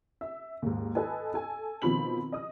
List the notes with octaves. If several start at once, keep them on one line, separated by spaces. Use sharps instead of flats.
E5
D#2 G#2
A4 B4 D#5 G#5
A4 G#5
B2 D#3 F3 C4 B5 F#7
D#5 D#6